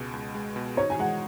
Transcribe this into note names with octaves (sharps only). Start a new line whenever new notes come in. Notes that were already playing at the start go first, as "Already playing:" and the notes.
Already playing: C#2 B2 G#3
C#2
G#3
B2
D#4 C#5
G#5
G#3 F#5